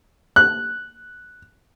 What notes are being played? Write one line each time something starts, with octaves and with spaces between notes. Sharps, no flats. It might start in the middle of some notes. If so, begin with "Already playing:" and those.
F#6